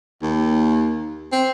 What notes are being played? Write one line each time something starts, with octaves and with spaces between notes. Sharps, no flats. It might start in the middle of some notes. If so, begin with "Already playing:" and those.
D#2
C4